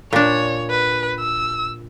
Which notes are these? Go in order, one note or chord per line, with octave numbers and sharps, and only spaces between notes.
A#2 D4 C#5
B4
E6